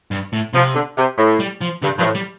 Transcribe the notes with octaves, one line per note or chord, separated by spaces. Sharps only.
G2
A2
C3 F3
D3
C3
A2
G3
F3
G2 D3
G2 F3
A2
G3